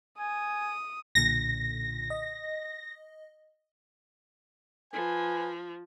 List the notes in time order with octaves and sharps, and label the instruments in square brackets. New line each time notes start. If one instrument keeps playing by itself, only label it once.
[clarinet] G#5 [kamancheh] D#6
[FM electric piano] B1 A#2 D3 [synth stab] A#6
[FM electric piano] D#5
[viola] F3 [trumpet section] B4 G#5